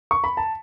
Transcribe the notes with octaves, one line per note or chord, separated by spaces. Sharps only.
C#6
B5
A5